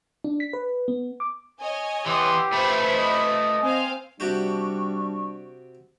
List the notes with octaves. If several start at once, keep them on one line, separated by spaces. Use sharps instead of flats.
D4
B6
B4
B3
D6
C#5 D#5 G#5
E3 B3 G4 C6
A3 F4 B4 C5 E5 B5
D#5
C4 C5 F5 G#5
C3 G3 D4 F#4 G4 C#6